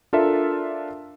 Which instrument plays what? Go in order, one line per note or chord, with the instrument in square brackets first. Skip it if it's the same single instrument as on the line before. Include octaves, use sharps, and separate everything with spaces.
[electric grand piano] D4 F4 A4 A#4 E5